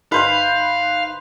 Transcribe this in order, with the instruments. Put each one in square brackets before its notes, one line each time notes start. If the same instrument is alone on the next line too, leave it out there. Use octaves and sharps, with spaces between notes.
[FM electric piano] G1 D#4 [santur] B4 C5 B5 [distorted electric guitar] F5